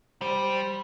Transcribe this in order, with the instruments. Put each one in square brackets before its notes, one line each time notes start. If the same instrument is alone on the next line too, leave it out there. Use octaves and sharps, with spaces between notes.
[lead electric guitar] G3 [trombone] C5